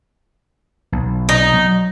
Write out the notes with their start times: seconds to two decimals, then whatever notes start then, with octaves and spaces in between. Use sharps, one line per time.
0.92 B1
1.29 D#4
1.54 F#3